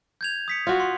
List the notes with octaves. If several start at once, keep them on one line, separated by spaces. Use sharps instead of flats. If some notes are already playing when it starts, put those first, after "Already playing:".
G6 G#6 F7
D#6 B6 C#7
F4 F#4
C6